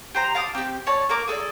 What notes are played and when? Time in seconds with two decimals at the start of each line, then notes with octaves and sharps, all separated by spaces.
0.15 G4 C5 A#5
0.35 F5 A5 D6 D#6
0.55 C4 G4
0.87 C#5 D5 A5
1.09 A#3 A#4 D6
1.28 G#4 A4 C#5 D5